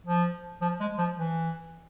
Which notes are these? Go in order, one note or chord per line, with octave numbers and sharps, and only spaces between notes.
F3
F3
G#3
F3
E3